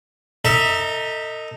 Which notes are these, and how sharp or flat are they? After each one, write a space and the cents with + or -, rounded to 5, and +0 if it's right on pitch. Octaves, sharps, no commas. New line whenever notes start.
D#4 +0 A4 +40 E5 -15